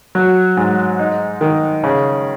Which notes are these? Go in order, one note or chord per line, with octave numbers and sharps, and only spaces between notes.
F#3
G#2
D#4
D#3
C#3